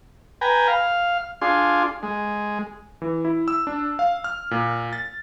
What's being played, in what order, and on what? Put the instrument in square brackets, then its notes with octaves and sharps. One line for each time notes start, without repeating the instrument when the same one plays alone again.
[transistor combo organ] B4 G5 G#5 A#5
F5
D4 F4 G#4 C6
G#3
[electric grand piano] E3
E4
E6
D4
F5
F6
A#2
A6